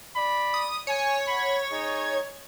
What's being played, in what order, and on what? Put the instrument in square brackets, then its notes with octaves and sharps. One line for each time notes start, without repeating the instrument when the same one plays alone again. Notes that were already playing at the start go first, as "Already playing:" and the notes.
[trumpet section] D5 B5
[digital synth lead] D#6
[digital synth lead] C#5 [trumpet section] G#5
[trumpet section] F#5 B5
D#4 G#4